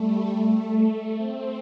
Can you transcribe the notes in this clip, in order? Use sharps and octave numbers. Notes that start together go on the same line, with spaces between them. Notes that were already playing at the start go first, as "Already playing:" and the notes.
Already playing: G3 A3
A3
C4